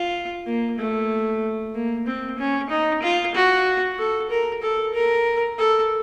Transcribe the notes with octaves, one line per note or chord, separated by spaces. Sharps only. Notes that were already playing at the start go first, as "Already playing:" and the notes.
Already playing: F4
A#3
A3
A#3
C4
C#4
D#4
F4
F#4
A4
A#4
A4
A#4
A4